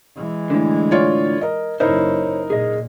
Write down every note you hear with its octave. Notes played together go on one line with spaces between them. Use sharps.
E3 G#3
A2 D3
F4 C#5 D5
A#4 D#5
F#1 D#4 E4 A#4 C5 C#5
A#2 G#4 D#5